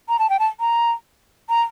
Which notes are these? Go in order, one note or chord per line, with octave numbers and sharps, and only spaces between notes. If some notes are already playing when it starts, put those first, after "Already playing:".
A#5
A5
G5
A5
A#5
A#5